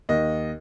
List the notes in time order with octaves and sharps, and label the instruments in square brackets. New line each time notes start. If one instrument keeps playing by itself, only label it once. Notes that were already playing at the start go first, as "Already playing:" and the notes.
[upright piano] D#2 D#5